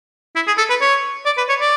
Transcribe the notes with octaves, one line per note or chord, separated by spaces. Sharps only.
E4
G#4
A4
B4
C#5
D5
B4
C#5
D5